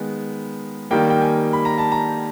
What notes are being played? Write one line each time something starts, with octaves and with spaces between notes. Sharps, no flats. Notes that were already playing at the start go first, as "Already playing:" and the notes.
Already playing: D#3 G#3 B3
D#3 G3 A#3 G5
G5
G#5
B5
A#5
A5
A#5